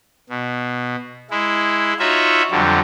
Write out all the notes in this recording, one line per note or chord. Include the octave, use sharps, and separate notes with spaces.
B2
G#3 E4
D#4 F4 F#4 C#5 E5
F2 D3 F#3 G3